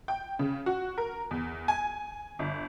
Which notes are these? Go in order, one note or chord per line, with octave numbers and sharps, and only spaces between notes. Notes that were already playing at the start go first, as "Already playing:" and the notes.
G5
C#3
F#4
A#4
E2
G#5
G1